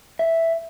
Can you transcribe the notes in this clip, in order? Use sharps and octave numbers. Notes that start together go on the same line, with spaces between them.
E5